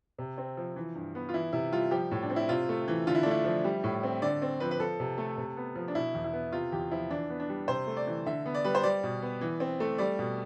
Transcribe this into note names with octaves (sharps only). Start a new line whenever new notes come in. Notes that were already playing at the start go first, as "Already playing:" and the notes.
C3
C4
F3
E3
G2
B3
F4
E3 E4
C3 E4
G3 F4
F3 G4
A2
D4
C4
E4
C3 F4
A3
E3
D3 F4
E4
D4
A3 E4
F3
G3
A2
C4
D3 D5
C4
F3 B4
B4
F3 A4
C3
A3
C3
B3
F3
D4
B2 E4
E2
E4
B3
C3 F4
E2 G4
F3 E4
E3 D4
B3
D4
G3
C3 C5
A3
D5
E3
D3 E5
B3
D5
G3 B4
C5
G3 D5
B2
B3
E3
C4
A3
G3 D5
B2